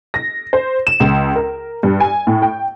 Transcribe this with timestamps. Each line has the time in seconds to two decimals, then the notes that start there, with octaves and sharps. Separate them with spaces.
0.14 A#6
0.53 C5
0.87 E7
1.00 C#2
1.36 A#4
1.83 G2
2.00 G#5
2.27 A2
2.42 G5